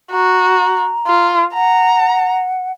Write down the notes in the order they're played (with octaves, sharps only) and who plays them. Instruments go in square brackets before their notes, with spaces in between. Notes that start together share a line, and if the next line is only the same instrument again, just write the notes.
[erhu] F#4 [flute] A#5
[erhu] F4
[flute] F#5 [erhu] A#5